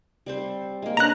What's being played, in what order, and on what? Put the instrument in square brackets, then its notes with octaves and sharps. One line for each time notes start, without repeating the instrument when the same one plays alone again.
[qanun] G3 C4 C5
G#3 A#3
[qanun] C#4 D4 B4 [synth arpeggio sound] A#5 F#6